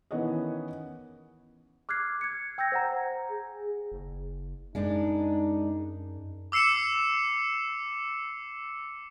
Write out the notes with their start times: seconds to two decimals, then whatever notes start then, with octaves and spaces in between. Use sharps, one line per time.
0.11 D#3 E3 B3 C#4 C#5 D#5
1.89 D6 F6 F#6 G#6 C7
2.21 G#6 C#7
2.58 G5 E6 G6 G#6 A#6
2.72 C5 F#5 A#5
3.30 G#4
3.92 F#1
4.75 F#2 G#3 D4 D#4
6.52 D6 E6 C7 C#7 E7